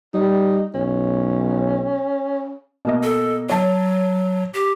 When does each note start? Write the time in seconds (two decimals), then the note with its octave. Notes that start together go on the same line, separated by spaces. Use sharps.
0.14 G3 D#4
0.74 B1 C#4
2.85 B2 A#3 D#5
3.03 A4
3.50 F#3 C#5 A5
4.54 G4